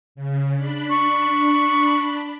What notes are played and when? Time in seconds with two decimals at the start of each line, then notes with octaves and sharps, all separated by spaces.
0.15 C#3
0.55 D4 B5
0.91 C#6